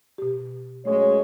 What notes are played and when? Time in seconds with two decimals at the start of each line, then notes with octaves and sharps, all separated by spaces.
0.18 B2 G4
0.85 F#2 G#3 A3 C#5